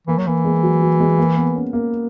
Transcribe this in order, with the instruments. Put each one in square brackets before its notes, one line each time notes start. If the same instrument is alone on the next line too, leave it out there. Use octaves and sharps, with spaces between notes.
[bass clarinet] E3 [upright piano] A#3
[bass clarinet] F#3
[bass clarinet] E3 [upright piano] A#3
[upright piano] G#3
F#3
F#3
G#3
A#3
B3
C#4
A#3